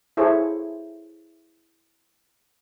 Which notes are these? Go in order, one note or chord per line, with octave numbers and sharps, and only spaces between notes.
E4 G#4 A4 C5 C#5 E5